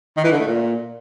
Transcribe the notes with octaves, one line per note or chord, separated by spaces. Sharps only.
D#3
E3
D3
A3
A#2